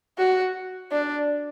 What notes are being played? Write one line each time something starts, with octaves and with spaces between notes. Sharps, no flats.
F#4
D4